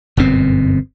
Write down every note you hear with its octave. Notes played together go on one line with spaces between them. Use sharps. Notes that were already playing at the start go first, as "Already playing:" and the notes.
G1 F#2 B2 C4